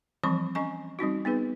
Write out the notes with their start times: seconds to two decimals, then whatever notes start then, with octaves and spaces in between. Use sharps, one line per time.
0.23 E3 F3 G3 C4 B5 C#6
0.55 C#4 D#5 G#5 C#6
0.99 G3 C4 D#4 F#4
1.25 B3 D#4 G#4 B4